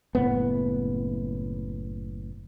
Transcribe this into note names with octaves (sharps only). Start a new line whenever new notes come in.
F#1 A2 B3